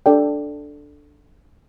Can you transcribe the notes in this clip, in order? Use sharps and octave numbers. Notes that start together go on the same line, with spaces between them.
D4 A4 D5 G5